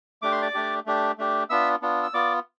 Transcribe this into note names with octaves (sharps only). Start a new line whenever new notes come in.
A3 D4 G4 D6
C6
D5 D6
A3 D4 G4
A3 D4 G4
A3 D4 G4
B3 D4 F4 E5 E6
B3 D4 F4
E6
B3 F4 D5 D6